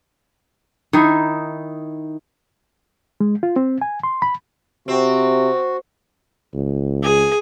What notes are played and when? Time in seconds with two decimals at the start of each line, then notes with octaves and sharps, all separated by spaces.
0.93 D#3 D#4 E4
3.21 G#3
3.43 F4
3.56 C4
3.82 G#5
4.03 C6
4.22 B5
4.88 C3 C4 F#4
6.54 C#2
7.03 G#4 G#5